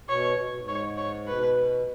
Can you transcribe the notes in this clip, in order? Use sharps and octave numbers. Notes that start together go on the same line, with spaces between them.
B2 C#5
B2
B2
G#2
C#5
C#5
B2 B4